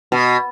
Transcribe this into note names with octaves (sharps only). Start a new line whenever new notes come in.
B2